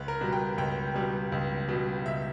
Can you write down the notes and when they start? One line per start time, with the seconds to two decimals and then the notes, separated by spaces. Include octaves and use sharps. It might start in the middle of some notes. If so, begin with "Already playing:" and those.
Already playing: C#2 B4
0.08 A#4
0.21 B2 G3
0.33 G5
0.57 C#2 G5
0.95 B2 G3
1.32 C#2
1.68 B2 G3
2.06 C#2 E5